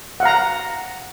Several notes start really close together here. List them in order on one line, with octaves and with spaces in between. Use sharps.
F#5 F5 A#5